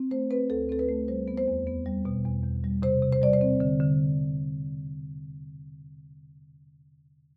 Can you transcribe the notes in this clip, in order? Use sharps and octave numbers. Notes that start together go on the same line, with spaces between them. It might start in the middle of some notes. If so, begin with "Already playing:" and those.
Already playing: C4
A3 C5
C4 B4
D2 A4
C4 A4
B4
A3
G3 C5
B3
C5
E2
B3
G3
B2
E2
E2
G3
C3 C5
C3
C5
G3 D5
C5
C4
D3
D3